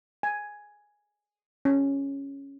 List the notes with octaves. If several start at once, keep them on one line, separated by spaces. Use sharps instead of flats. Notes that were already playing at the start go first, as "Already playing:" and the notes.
G#5
C#4